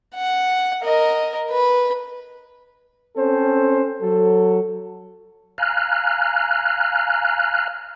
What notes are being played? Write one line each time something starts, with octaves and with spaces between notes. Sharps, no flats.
F#5
A#4 D#5
B4
C4 C#4 A4 C5
F#3 A4
F5 G#5 A#5 F6 F#6